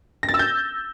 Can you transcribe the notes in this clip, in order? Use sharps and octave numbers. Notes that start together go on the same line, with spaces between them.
A#6
A6
E6
G6